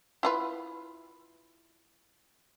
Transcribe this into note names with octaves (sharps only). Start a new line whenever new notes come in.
E4 F4 B4